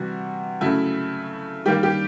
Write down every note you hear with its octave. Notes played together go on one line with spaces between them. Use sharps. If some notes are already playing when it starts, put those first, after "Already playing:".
Already playing: C3 E3 G3 F#4
C#3 F#3 A3 E4
D#3 G3 A#3 G4
G4